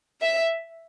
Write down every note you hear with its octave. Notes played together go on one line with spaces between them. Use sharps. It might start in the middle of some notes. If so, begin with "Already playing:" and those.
E5